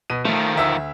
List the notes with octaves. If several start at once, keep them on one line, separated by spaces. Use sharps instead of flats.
B2 D#7
D#3 F3 A3
D2 E5 E6